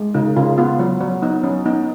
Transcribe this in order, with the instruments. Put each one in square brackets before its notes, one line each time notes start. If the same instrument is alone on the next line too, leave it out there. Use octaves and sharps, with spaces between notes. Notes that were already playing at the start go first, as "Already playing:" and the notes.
Already playing: [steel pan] G#3
C#3 D#4
C#3 F4
B3 F4
F#3
F#3
B3 D#4
F#3 C#4
B3 D#4